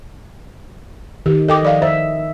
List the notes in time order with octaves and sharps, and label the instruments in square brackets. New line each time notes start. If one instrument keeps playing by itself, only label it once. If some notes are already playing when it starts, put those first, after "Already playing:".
[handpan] D#3 [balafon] G4
[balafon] A4 G5 D6 [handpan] D#5
[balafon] F3 D5 F5
[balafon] C5 [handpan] E5